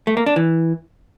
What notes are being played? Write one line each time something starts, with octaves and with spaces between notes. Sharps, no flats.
A3
A#3
D4
E3